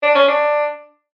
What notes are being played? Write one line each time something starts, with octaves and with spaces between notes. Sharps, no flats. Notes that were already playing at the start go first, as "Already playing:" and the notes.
D4
C#4
D4